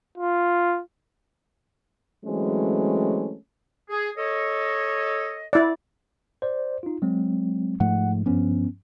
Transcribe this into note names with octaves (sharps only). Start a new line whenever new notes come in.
F4
E3 F#3 G#3 A3 C4 C#4
G#4
A4 C#5 D#5
E4 D5
C5 D5
D#4 F4
F#3 G#3 C4
G#2 F3 A3 F#5
G2 F3 B3 C#4